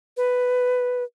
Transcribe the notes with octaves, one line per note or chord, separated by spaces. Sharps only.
B4